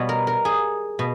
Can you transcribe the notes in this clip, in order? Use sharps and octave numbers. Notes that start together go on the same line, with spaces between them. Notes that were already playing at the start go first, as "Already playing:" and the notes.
Already playing: B2 G3 B3 C#5 D#5
A#4
A#4
G#4
B2